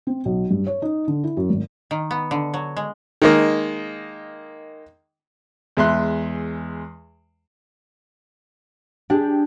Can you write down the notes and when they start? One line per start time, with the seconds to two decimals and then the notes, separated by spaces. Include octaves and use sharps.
0.07 C4
0.25 B1
0.51 G2
0.67 C#5
0.82 D#4
1.08 D3
1.24 E4
1.37 F#2
1.50 G#1
1.91 D#3
2.11 B3
2.31 D3
2.54 F#3
2.77 G#3
3.22 D#3 G#3 A#3
5.77 E2 G#3 E5 C6 F#6
9.10 D4 G4 G#4